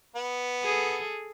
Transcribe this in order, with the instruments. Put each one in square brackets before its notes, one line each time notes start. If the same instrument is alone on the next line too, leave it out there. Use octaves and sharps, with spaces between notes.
[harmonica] B3
[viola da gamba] G#4 A4